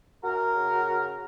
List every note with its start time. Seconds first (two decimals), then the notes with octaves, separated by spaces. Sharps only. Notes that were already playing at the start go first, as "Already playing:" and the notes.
0.24 F#2 F#4 A#4
0.55 C#3